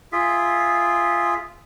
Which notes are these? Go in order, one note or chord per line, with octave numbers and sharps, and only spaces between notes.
F4 G#4 E5